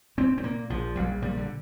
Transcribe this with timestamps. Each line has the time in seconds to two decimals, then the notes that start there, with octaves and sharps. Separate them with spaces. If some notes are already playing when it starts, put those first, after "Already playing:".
0.18 A#2 C4
0.38 C4
0.43 A#2 A#3
0.70 A#1 F3
0.96 A#1 G3
1.22 A#2 G3
1.37 D3